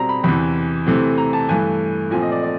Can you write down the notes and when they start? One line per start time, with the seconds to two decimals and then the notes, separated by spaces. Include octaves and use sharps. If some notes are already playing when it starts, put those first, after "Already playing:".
Already playing: B2 G3 C4 A#5
0.09 B5
0.24 E2 C3 E3 B5
0.86 C3 E3 A3 C4
1.18 A#5
1.33 A5
1.49 G2 E3 A3 G#5
2.11 A#2 F3 A3 C4 G#5
2.22 D#5
2.32 D5
2.43 D5